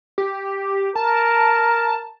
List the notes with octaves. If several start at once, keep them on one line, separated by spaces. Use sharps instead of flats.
G4
A#4 A5